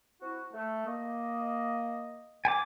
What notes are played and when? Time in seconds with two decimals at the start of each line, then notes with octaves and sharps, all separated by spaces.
0.21 C4 E4 F#4
0.53 A3
0.85 A#3 D#5
2.45 G#5 D6